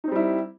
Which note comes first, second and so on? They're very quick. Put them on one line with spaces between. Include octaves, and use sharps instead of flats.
D#4 C4 G3 E4